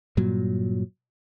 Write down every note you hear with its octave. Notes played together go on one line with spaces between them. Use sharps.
G2 A#2 F#3